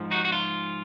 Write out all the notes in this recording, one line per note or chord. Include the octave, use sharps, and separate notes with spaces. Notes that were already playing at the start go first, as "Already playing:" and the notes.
Already playing: G#2 F3
D#4 F#4
F#4
F4